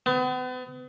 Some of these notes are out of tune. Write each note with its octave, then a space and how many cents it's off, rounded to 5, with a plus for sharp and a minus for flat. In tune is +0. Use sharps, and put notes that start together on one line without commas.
B3 +40